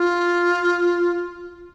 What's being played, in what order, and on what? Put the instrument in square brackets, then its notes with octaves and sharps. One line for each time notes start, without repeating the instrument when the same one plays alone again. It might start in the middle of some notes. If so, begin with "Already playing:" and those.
Already playing: [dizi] F4